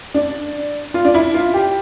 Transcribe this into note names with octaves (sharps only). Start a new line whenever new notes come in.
D4
F4
D4
E4
F4
G4